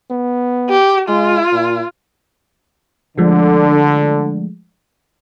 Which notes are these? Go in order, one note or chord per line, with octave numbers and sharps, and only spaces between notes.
B3
G4
G#3 F4
A#2
D3 F3 G#3 A3